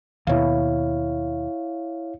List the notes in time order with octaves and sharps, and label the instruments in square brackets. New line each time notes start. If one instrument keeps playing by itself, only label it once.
[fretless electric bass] D#2 B2 [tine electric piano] E4 C#5 F5